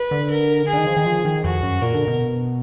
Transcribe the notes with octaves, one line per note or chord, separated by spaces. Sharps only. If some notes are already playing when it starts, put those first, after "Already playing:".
Already playing: B4
D3
A#4
G#4
D3
D#3
F3
D#3
F3
D#3
F2 F#4
F#2
A#2 A#4
D3
B2